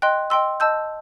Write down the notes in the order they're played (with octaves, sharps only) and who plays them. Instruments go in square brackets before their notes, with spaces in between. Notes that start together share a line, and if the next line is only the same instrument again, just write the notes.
[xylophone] D#5 G5 C6 F#6
D#5 G5 C6 E6
D#5 A5 E6 G6